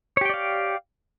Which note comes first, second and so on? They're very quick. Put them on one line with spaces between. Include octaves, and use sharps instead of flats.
C#5 G4 G5 D5 F5